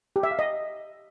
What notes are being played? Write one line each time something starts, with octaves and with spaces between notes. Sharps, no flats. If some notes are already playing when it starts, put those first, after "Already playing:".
G4
E5
F5
D#5